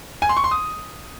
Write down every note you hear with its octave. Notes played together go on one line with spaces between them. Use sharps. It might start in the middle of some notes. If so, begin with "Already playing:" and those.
G#5
C6
C#6
C6
D#6